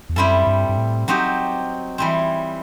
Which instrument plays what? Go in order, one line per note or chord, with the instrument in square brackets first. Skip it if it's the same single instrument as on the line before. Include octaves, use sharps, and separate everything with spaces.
[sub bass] E2
[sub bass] F#2 [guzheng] G3 C4 E4 A4
[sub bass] G2
G2
A2
[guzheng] F#3 C4 D#4 G4
E3 G3 C4